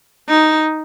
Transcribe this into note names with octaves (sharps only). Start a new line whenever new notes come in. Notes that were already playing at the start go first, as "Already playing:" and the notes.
D#4